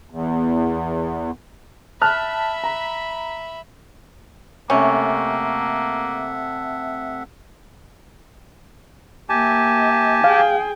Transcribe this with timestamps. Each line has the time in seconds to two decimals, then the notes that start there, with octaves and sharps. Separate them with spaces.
0.10 E2
2.02 E5 A5 B5 F6 F#6
2.64 A#5
4.70 C3 A3 A#3 C#4 E5 F#5
9.29 A#3 G4 E5 G#5 A5
10.24 G#4 F5 G5